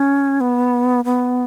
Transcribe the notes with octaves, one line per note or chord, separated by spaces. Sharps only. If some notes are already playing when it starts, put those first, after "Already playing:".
Already playing: C#4
B3
B3